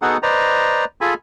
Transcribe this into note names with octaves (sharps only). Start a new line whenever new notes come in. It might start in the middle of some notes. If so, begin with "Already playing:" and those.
B3 D#4 F#4 G#4 A4 F#5
B4 C5 D5 D#5 A#5
F4 G#4 A4 G#5 B5